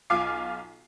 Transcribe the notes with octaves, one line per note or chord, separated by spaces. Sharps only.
B1 F4 F5 G#5 D6 C7